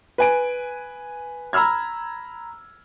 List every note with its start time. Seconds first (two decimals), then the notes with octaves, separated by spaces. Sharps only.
0.18 B4 G#5 D7
1.53 A#5 B5 E6 F6 G#6